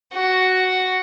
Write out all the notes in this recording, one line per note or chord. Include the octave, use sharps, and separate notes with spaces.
F#4